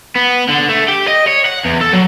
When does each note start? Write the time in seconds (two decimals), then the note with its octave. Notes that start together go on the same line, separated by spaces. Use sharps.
0.15 B3
0.49 D3
0.69 A3
0.88 G4
1.08 D#5
1.28 C#5
1.46 F#5
1.65 E2
1.81 A4
1.93 F#3